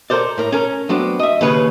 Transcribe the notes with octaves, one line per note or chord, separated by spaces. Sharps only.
A4 A#4 C5 D5
A2 A#4
C#4 A4 A#4
F#3 A3 B3 C4 D4
D#5 E5
D#2 C#3 B4 C#5